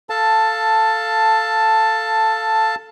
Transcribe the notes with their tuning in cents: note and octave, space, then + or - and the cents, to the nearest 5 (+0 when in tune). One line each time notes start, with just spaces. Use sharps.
A4 +5 F5 +0 A5 +10